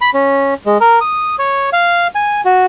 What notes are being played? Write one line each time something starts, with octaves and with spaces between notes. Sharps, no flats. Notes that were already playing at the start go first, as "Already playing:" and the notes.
B5
C#4
G#3
A#4
D#6
C#5
F5
G#5
F#4